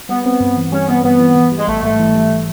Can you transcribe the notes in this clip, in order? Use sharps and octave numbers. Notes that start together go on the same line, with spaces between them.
G3 B3
B3 C4
G2
E3
G3 C#4
B3 C4
G2 B3
E3
E3
G3
G#3
A1 A3
G#2 A3
E3
G3